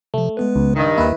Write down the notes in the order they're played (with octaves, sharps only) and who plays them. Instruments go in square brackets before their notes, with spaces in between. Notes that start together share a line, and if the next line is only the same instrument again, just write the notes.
[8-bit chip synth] C3 F3 [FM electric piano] A3
[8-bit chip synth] G#3 B3 B4
[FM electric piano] C#2
[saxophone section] G2 D#3
[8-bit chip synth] D#2 A#3 [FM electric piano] E4 B4